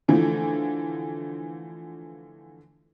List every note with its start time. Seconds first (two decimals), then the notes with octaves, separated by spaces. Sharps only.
0.08 D3 E3 F3 A3